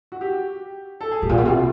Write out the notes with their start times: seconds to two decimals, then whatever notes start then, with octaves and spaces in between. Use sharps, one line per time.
0.12 F#4
0.21 G4
1.01 A4
1.11 G#4
1.22 A2 G4
1.29 A#2
1.34 B2 F#4
1.45 C3 F4